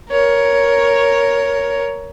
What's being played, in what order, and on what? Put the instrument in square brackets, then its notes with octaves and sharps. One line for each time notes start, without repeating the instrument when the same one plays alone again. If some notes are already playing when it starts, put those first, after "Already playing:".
[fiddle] A#4 C#5